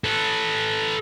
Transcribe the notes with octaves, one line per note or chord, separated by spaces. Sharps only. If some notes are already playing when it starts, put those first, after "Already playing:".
A4 B4